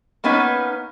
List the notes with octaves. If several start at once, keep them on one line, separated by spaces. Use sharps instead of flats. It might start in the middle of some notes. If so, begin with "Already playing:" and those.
A#3 B3 C#4 D#4 B4